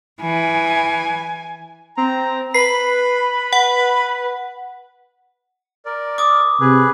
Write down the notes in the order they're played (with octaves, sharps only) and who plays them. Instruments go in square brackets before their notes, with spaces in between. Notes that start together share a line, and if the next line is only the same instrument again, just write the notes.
[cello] E3 [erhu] G#5
[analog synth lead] C4 [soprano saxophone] A#5
[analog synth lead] B4 [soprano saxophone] B5 [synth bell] C7
[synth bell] F#5
[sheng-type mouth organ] A#4 D5
[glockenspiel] D6 D#6
[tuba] C3 [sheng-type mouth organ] G#4 B4